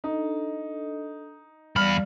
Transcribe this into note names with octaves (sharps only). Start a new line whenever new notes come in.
D4 D#4 A4 D#5
E2 G3 F5 B5 F6